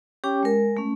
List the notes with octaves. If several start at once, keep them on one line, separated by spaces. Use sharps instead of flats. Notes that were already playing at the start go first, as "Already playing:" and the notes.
C#4 G4 C#5 G5 D6
G#3 A#4
A3 C#4